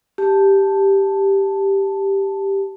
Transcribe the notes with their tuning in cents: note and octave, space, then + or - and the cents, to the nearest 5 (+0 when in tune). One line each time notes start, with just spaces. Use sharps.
G4 +0 A5 +0